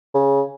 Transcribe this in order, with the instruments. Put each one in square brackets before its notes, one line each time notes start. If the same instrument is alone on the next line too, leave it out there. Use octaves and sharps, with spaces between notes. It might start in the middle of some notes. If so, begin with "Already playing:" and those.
[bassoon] C#3